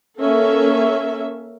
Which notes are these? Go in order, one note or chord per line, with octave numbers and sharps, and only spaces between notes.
A#3 C#4 A4 E5